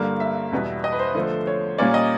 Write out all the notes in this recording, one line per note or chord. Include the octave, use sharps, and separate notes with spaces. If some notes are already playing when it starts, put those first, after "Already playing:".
Already playing: G2 D3 G3 A#3
E5
E2 B2 G3 B3
D#5
B4
C5
D3 F3 A3
C#5
A#2 G3 A#3 C#4 D5
D#5